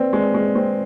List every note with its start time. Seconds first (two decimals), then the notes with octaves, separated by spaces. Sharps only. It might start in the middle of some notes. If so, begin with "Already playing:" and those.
Already playing: C4 B4 D5
0.13 G#3
0.20 D5
0.34 G#3
0.49 D5
0.55 C4